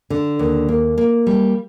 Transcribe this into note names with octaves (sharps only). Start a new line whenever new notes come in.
D3
D#2
A#3
A#3
G3